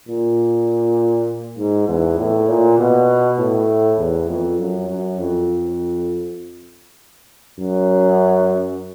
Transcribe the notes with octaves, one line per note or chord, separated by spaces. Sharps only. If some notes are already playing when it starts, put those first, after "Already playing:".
A#2
G#2
E2
A2
A#2
B2
A2
E2
F2
F#2
F#2
F2
F#2